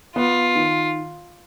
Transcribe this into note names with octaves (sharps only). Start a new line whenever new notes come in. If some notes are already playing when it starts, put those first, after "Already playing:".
B3 F4
D#3